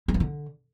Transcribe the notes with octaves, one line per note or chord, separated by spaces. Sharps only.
G#3
F3
D3